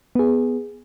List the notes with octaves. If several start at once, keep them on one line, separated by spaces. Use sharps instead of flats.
B3 G#4